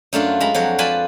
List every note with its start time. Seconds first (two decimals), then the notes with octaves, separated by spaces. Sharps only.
0.13 F#2 A3 D4 F4
0.40 G#3 A#5 B5
0.54 F2 F#3 F#4 C#5
0.78 F4 B4 D5 G#5 A5 B5